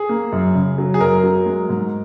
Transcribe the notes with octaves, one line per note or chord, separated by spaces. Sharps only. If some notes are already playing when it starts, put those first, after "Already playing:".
Already playing: G#4
A#3
F#2
C#3
F#3
G#4
F#2 A#4
F#3
G#3
G#2